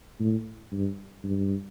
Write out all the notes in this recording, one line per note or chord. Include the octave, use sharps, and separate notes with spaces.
A2
G2
G2